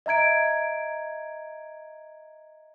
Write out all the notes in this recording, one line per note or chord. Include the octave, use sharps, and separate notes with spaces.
D#5 E5 A#5 G#6 D7